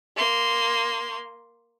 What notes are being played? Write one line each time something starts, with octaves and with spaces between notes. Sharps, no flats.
A#3 C6